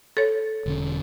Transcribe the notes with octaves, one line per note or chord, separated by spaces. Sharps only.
A4 C#5
E1 D3 C#4